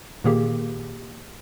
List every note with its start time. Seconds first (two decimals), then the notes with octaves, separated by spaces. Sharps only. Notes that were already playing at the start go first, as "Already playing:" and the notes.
0.24 A#2 D#3 A#3 G4 G#4